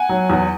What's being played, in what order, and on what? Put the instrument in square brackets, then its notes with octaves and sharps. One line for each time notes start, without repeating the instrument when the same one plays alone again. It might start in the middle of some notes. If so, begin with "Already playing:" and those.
Already playing: [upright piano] F#5 G#5
F#3
E2